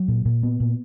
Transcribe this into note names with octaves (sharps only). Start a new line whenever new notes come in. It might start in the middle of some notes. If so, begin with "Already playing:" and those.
Already playing: F#3
A#2
A#2
B3
A#2